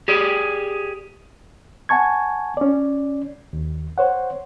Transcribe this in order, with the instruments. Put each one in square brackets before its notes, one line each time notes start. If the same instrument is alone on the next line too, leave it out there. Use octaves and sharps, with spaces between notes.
[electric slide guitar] G4 G#4 D5
[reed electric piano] F#5 G#5 A5 C#6 G#6
C#4 D5
D#2
C5 C#5 F#5